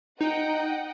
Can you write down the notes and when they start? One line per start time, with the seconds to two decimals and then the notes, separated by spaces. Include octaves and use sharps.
0.21 D#4 D#5 F#5 G5